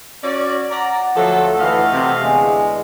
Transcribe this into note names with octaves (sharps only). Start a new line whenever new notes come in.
C#4 F#4 D5
D5 F#5 A#5
D2 F3 F#3 A3 A4
D2 E3 A3 D#5 F5
C3
E2 D3 G#3 G#5